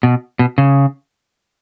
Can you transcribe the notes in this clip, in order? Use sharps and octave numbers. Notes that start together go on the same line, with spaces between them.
B2
B2
C#3